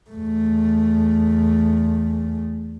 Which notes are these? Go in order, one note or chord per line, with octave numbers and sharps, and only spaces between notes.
E2 A3